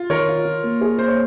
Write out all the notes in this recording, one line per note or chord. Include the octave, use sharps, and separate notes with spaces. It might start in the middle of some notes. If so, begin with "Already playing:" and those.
Already playing: F4
D#3 A#4 C#5
F4
F4
A#3
G#4
A#3 C5
C#5